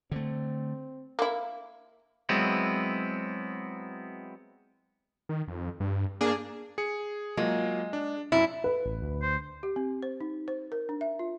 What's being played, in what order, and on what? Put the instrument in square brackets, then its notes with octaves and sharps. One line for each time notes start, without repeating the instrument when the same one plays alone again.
[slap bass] D3 A3 [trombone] C4
[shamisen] A#3 E4
[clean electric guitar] F#3 G#3 B3 C4 E4
[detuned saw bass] D#3
F2
G2
[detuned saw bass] A#3 [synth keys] D4 G#4
[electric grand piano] G#4 C#7
[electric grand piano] F#3 A#3 F4 [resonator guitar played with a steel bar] G#3
[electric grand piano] D4
[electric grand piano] F#2 [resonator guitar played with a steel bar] E4
[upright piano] B4
[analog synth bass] A1
D2
[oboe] C5
[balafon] G4
C4
C5
D#4
C5
A#4
D4
E5
F4